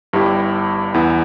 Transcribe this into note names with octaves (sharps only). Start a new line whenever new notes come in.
G1 G2 G3 E4 G4
E2 E3 B3 E4